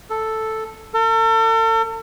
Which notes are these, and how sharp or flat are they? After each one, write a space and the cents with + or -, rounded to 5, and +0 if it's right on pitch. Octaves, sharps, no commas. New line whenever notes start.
A4 +0
A4 +40